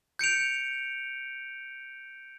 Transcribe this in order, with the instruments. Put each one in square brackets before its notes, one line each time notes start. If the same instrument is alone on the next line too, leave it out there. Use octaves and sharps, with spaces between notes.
[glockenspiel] G6 C#7 D7 F7